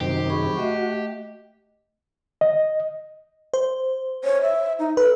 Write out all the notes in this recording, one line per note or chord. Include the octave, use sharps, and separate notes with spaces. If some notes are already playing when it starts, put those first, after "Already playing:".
F#2 C3 D#3 G4 C5
G#4 B5 C#6
A3 F#4 D#5 E5
D#5
C5
C#5
E5
D#4
A4 B4